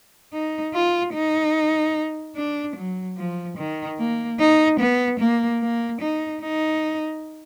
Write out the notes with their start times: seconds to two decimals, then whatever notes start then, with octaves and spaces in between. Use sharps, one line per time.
0.33 D#4
0.74 F4
1.14 D#4
2.36 D4
2.76 F#3
3.18 F3
3.58 D#3
3.99 A#3
4.40 D#4
4.80 B3
5.20 A#3
5.62 A#3
6.02 D#4
6.43 D#4